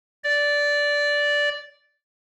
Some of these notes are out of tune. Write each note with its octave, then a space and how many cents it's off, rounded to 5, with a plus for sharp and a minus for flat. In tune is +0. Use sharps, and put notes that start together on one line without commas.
D5 -10